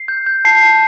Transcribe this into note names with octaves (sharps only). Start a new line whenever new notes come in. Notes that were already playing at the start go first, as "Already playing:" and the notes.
Already playing: C7
G6
G6
A5 C7
A5